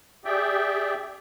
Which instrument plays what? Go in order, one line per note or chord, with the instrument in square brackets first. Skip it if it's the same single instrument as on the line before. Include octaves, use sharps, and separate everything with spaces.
[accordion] G4 G#4 D5 E5 G5